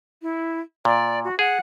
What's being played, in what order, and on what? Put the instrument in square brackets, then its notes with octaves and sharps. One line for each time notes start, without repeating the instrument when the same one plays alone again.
[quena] E4
[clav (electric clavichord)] A#2 [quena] D5
[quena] F#4
[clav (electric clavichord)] G#4 [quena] F#5